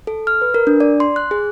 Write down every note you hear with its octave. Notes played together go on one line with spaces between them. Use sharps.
A4
F6
B4
A#4
D4
D5
C6
F#6
G#4